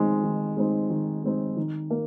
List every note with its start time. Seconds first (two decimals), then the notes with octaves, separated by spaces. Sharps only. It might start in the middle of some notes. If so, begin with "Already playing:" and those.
Already playing: D#3 G#3 C4 D#4
0.23 D#3
0.56 G#3 C4 D#4
0.90 D#3
1.23 G#3 C4 D#4
1.57 D#3
1.90 A#3